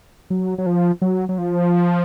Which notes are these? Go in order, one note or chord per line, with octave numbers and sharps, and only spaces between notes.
F#3
F#3
F3
F#3
F#3
F3